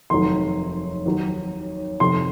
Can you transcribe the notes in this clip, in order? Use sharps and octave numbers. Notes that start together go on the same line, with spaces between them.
F1 D#2 D#3 F#3 C6
D#2 D#3 F#3
F2 C3 D#3 C6